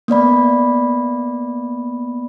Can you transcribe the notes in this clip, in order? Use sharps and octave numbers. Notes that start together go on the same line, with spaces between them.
A#3 B3 D5 B5